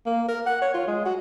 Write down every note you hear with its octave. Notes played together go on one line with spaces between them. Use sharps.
A#3
A#4
F#5
C#5
F4
G#3
F#4